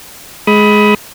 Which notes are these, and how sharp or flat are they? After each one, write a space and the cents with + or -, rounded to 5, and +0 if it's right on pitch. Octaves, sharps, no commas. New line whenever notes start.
G#3 +15 B5 +0 D#6 +25